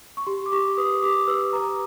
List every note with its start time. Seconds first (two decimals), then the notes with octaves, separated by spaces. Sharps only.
0.17 C#6
0.27 G4 C6
0.46 D6
0.52 G4 C#6
0.77 B4 D#6
1.03 G4 D6
1.27 B4 E6
1.53 B4 A#5